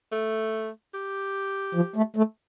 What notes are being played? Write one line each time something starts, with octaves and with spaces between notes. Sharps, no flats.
A3
G4
F3
A3
A3